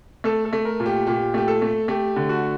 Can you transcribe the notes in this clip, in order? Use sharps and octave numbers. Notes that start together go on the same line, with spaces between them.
A3 A4
A4
A3
A#4
A#2
G4
A#2 G4
A3 G4
A4
A3
A3 G4
D3
F#4